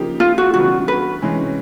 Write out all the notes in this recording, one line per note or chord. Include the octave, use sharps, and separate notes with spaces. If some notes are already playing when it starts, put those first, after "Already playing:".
Already playing: C#3 F3 A#3 D#4 G4
F4
F#4
C#3 E3 G3 B3 D4 F#4
B4
C3 E3 G#3 C#4